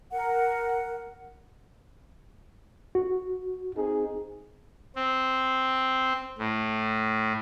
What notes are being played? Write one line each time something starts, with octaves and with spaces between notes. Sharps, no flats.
A#4 F#5
F#4
C4 D#4 G#4
C4
A2